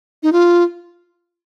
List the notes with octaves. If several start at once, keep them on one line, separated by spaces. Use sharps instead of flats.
D#4
F4